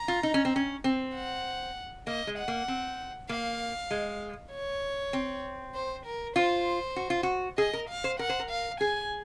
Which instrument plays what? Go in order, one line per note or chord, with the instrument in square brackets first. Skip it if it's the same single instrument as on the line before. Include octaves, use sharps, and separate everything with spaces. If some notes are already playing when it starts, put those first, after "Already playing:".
Already playing: [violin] A#5
[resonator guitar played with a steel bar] F4
D#4
C#4
C4
C#4
C4
[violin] F#5
[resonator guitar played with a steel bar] A#3 [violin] D#5
[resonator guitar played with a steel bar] G#3
[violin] F#5
[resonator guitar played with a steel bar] A#3
C4
[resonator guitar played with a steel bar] A#3 [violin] F5
[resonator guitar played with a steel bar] G#3
[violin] C#5
[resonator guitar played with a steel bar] C4
[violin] C5
A#4
[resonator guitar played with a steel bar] F4 [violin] C5
[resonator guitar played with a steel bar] F#4
F4
F#4
[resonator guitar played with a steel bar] G#4 [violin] D#5
[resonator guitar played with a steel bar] A#4
[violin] F5
[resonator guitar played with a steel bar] C5
[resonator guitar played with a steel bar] A#4 [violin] F#5
[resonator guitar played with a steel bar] C5
A#4
[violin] F5
[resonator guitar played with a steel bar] G#4 [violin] G#5